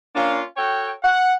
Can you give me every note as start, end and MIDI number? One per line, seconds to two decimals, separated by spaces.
0.15 0.42 58
0.15 0.42 61
0.15 0.42 62
0.15 0.42 65
0.57 0.90 66
0.57 0.90 69
0.57 0.90 73
0.57 0.90 79
1.03 1.34 78